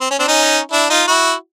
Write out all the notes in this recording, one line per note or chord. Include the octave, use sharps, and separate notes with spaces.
C4
C#4
C4 D4
C#4 D#4
D4 E4
D#4 F4
E4 F#4